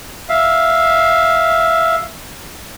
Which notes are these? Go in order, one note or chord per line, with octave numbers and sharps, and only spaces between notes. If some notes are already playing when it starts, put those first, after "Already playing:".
E5 F5